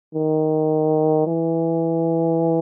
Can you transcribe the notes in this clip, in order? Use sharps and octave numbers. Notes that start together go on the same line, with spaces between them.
D#3
E3